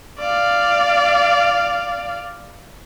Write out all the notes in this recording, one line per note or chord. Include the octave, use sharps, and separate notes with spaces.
D5 F5